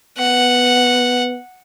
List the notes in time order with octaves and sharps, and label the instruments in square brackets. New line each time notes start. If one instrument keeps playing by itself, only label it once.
[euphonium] B3 [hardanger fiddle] F#5